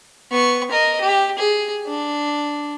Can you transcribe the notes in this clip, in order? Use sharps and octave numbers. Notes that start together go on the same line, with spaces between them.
B3 C#6
A#4 D#5
G4
G#4
D4